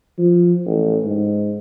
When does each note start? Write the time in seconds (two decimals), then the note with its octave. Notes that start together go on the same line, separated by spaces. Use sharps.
0.18 F3
0.66 A1
1.05 G#2